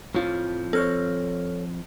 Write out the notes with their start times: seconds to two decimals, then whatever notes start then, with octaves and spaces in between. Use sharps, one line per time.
0.15 F2 A2 F3 F4
0.73 C4 A4 C5 C#5 F6